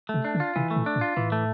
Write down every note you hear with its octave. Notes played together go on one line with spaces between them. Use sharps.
A3
C3
D4
D3
F4
C3 E3
A3
A#2
D4
A2
F4
A2 E3
A3